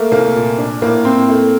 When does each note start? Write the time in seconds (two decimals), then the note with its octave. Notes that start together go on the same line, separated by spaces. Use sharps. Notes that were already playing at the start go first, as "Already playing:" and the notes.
Already playing: A3 A#3
0.12 C2 A#3
0.35 A#2
0.58 D4
0.82 A2 A#3
1.05 A2 C4
1.29 A3